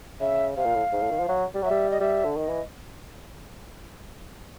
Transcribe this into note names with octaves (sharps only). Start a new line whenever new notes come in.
C#3 E5
C3 F5
A#2
A2
G#2
A2
D#3
F3
F#3
G3
F#3 E5
G3
D#5
G3 E5
D3
D#3 D#5
E3